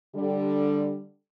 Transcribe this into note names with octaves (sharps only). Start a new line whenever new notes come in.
D3 G3